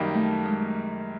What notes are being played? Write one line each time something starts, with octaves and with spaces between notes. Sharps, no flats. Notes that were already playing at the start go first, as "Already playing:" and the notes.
Already playing: F#2 D#3 G3 A#3 D#4
A3
G#3